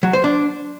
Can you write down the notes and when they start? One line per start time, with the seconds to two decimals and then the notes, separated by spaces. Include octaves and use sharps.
0.03 F#3
0.13 C5
0.24 D4